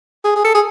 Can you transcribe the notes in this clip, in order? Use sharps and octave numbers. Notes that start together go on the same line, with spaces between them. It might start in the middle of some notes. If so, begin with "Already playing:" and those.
G#4
G#4
A4
G#4